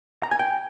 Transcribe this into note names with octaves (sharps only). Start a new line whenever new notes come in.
A#5
G#5
G5